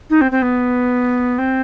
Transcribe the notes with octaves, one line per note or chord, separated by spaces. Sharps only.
D#4
C4
C4
B3
C4